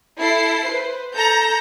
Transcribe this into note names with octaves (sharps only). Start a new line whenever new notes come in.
E4 A4 C7
B4 C5
A4 A#5 G6